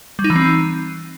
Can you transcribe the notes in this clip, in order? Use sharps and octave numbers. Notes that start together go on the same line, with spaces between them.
G3
D#4
E3
C4